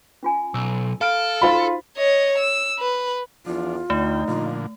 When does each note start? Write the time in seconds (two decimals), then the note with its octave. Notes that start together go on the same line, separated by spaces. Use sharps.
0.23 C#4 F4 G#5
0.54 B1 E6
1.01 A4 F5 B5 F6 D7
1.42 D#4 F4 F#4 C5 B5
1.97 C#5 D#5
2.38 E6
2.79 B4
3.46 E2 F3 D4 F4
3.90 D2 A3 D#4 G5
4.28 A#2 D3 F3 F4